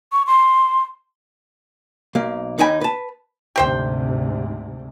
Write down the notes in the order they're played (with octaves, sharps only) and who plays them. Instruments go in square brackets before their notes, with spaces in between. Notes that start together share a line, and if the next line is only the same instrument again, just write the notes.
[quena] C#6
C6
[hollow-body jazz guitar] B1 A#3 F5
D#2 D#4 G5 G#5 B5
B4 A5
[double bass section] D2 G#2 C3 [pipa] G4 C5 G5